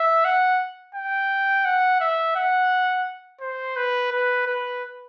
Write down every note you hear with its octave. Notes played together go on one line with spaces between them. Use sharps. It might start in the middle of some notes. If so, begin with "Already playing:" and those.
Already playing: E5
F#5
G5
F#5
E5
F#5
C5
B4
B4
B4